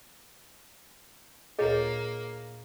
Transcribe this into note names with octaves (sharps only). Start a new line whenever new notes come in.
D2 A#2 A#3 F4 G#4 C#5 D#5